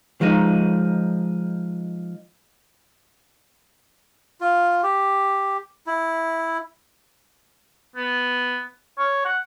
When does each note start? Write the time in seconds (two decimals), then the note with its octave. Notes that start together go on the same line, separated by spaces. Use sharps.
0.21 F3 G#3 D#4
4.41 F4
4.83 G4
5.86 E4
7.96 B3
8.98 C#5
9.25 F#5